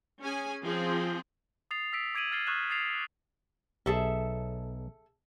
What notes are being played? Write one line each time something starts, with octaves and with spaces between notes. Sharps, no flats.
C#4 G#4 G#5
F3 C4 F4 G#4
D#6 A6 C7 F7
E6 B6 D7
D6 G#6 D7 D#7 F#7
F6 A6 C7 G7
C#6 D#6 F6 F#6 G#6 E7
D#6 A6 C7 F7
B1 G#4 A4 E5